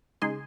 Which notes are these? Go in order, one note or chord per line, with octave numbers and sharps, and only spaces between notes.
C#3 G#3 D#4 G#5 C6